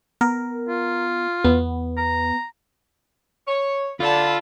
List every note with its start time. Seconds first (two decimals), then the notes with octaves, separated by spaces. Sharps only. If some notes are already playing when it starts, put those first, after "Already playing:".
0.21 B3 A#4
0.69 F4
1.44 E2 B3
1.98 A#5
3.48 C#5
4.00 D3 F4 A5 B5